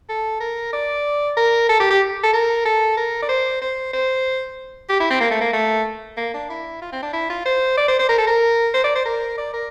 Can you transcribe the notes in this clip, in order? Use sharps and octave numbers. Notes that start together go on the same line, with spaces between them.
A4
A#4
D5
A#4
A4
G4
G4
A4
A#4
A4
A#4
D5
C5
C5
C5
G4
E4
C4
A#3
A3
A#3
A3
A#3
D4
E4
F4
C4
D4
E4
F4
C5
D5
C5
C5
A#4
A4
A#4
C5
D5
C5
A#4
D5
A#4